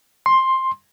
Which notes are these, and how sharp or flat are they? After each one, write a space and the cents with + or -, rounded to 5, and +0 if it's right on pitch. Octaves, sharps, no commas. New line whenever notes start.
C6 +10